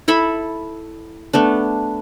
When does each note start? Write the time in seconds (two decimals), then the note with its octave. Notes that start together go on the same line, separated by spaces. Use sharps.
0.08 E4 A4 E5 B5
1.33 A3 B3 D4